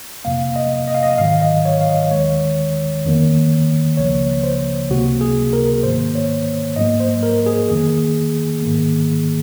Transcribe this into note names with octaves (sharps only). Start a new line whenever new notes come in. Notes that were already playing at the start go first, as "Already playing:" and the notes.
F2 C3 F#3 A#3 F5
D#5
D#5
F5
D#5
G#2 D#3 F#3 F5
D#5
C#5
F5
D#5
D#2 D#3 G#3 C#5
F2 D#3 A#3
C#2 C#3 F3 A#3 C#5
C5
C#2 C3 F#3 A#3 F#4
G#4
A#4
G#2 D#3 A#3 C5
C#5
G#2 F#3 A#3 D#5
C5
A#4
G#4
F2 D#3 A#3 G#4
G#2 D#3 A#3